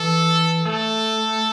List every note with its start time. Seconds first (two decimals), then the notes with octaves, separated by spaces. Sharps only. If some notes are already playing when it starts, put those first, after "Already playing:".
Already playing: E3 A4
0.65 A3 A4